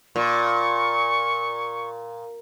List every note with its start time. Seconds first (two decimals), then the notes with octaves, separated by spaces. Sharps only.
0.16 A#2 C#6